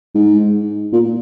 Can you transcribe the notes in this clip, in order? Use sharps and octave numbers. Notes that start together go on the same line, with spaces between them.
G#2
A#2